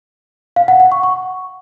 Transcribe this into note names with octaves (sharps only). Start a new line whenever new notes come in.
F5
F#5
F#5
C#6
C#6